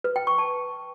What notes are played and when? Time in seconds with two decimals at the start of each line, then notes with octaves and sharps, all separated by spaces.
0.04 B4
0.16 G5
0.27 C#6
0.38 A5